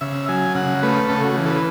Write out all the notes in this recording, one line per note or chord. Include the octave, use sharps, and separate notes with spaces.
C#3 E5
F#3 G#5
C#3 F#5
A3 B4
C#3 A4
F#4
E3
A4
B4